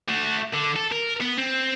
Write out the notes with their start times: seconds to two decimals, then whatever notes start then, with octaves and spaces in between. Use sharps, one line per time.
0.09 A3 F#4
0.54 D3
0.76 A4
0.92 A#4
1.21 B3
1.37 C4